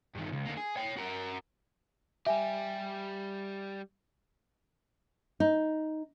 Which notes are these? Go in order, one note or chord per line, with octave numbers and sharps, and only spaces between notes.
G2 D#3
C#2
D3 A#3
G#4
C#5 G5
F#4 A#4
G3 G4 E5 G#5
D#4